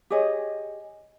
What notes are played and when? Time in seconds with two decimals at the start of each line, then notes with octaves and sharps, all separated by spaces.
0.10 G4 G#4 C#5 D#5